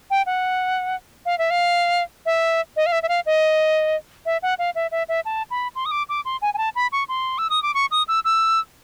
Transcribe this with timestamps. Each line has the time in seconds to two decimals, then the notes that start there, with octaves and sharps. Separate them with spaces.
0.10 G5
0.26 F#5
1.26 F5
1.38 E5
1.50 F5
2.26 E5
2.76 D#5
2.86 F5
2.92 E5
3.03 E5
3.09 F5
3.26 D#5
4.26 E5
4.43 F#5
4.59 F5
4.75 E5
4.91 E5
5.09 E5
5.25 A5
5.50 B5
5.75 C6
5.86 D#6
5.91 D6
6.09 D6
6.25 C6
6.42 G#5
6.54 G#5
6.58 A5
6.75 B5
6.92 C#6
7.09 C6
7.38 E6
7.50 D#6
7.63 D6
7.74 C#6
7.91 D#6
8.08 E6
8.25 E6